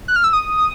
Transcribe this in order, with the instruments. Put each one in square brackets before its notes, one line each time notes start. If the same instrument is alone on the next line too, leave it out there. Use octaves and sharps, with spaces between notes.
[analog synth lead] F#6
F6
E6
D#6